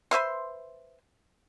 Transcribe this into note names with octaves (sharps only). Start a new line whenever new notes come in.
B4 C5 E5 C6